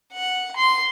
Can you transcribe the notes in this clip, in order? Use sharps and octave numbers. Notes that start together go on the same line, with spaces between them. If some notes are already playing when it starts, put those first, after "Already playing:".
F#5
C6